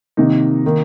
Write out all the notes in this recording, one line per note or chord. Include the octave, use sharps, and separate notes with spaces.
C3 D#3 A#3 D#4
D#3 A#3